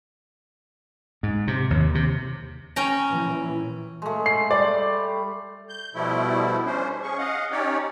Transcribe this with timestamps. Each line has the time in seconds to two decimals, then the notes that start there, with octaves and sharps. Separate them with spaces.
1.23 G#2
1.47 C3
1.70 D#2
1.95 C3
2.76 C#4 G5 A#5
3.07 A#2 E3
4.02 G#3 A3
4.26 C7
4.51 G3 D5
5.69 G6
5.94 B2 F3 G3 A3 E4
6.66 C#4 D4 C5
7.03 C#4 G#4 C#6
7.18 D#5 F5 F#5
7.52 C#4 D#4 G4 C#5 D5